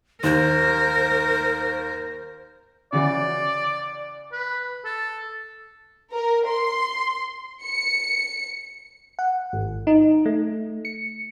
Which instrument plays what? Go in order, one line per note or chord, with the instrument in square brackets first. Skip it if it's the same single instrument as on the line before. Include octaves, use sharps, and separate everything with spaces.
[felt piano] D#2 [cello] A#4 [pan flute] C5
[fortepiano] C#3 E3 F#4 [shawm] D5
[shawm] B4
A4
[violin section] A#4
C6
C#7
[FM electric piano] F#5
G#1
D#4
A3
C#7